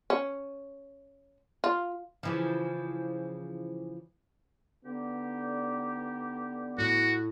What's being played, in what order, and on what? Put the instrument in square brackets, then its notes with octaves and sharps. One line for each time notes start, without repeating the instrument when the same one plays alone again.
[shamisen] C#4
F4
[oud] C#3 E3 F3
[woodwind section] D3 D#4 G4 [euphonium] B3
[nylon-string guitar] A2 [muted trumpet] F#4